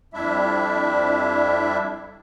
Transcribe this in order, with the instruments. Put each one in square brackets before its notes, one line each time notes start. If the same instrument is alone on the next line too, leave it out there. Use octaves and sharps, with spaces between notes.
[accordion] F2 G3 D4 E4 E5